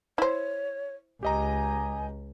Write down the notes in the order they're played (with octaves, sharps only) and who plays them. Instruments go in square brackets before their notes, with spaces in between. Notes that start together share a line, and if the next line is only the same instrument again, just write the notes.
[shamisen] E4 C5 [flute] C#5
[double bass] C#2 [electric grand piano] G4 D#5 A#5 [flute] G#5